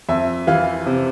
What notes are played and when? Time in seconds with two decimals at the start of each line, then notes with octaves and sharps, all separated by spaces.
0.09 F2 E5
0.47 E3 F5
0.86 C3